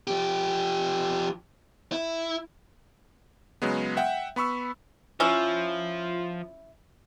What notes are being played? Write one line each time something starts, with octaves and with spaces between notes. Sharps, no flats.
F3 G4
E4
C#3 F#3 G#3 B3
E5 F#5 G5
B3 B5 C#6 E6
F3 C#4 E4